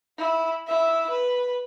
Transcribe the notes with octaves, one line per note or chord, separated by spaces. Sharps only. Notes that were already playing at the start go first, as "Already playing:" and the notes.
E4
E4 E5
B4